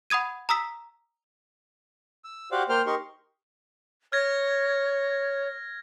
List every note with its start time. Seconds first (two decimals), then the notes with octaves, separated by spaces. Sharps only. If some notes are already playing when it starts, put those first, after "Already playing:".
0.10 F#5 B5 D#6 G#6 D#7
0.49 A#5 D#6 E6 B6
2.24 E6
2.52 F#4 G4 C5 D5 F5 F#5
2.69 A#3 C5 G5 F6
2.86 D#4 G4 A#4 C6 C#6
4.12 C#5 F6 G#6 A#6